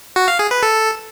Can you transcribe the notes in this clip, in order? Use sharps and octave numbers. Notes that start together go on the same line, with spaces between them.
F#4
F5
G#4
B4
A4